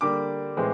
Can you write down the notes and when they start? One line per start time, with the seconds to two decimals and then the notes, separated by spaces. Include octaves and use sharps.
0.01 D3 G3 A#3 D6
0.57 A2 E3 G#3 C4